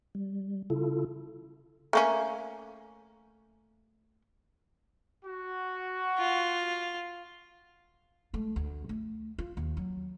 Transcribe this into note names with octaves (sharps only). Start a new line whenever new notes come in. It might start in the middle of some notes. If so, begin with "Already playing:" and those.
G3
C#3 E4 F4 A4
A3 A#3 C#4
F#4
F4
G#3 A3
D2
A3
F4
D#2
F#3